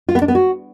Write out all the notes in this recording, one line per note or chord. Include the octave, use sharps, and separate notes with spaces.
F4
B3
D4
B3
F#4